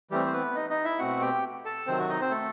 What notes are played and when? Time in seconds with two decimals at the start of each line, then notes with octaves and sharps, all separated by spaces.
0.11 E3 G3 A3 C4 G4
0.26 C5
0.33 B3 B4
0.56 D#4 D#5
0.70 D#4 D#5
0.85 E4 E5
0.99 B2 A3 C4 F#4 F#5
1.21 G4 G5
1.65 A4 A5
1.87 C3 D#3 F#3 C4 C5
1.98 F#4
2.09 D#4 D#5
2.21 C4 C5
2.31 A3 A4